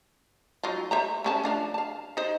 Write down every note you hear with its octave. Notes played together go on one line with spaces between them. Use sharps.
F#3 D#4 F4
C5 E5 A#5
A3 C#4 A5
F3 D4 F5
F5 A5
D#4 C5